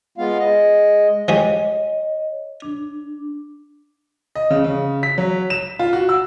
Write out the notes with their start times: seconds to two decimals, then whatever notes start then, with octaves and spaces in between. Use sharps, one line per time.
0.18 G#3 B3 F4 F5
0.39 G#3 D#5
1.28 F3 G#3 G4 C#5 D#5
2.62 D4
4.35 D#5
4.50 C#3
4.64 C#3
5.03 B6
5.18 F#3
5.50 E7
5.79 F4
5.93 F#4
6.09 E6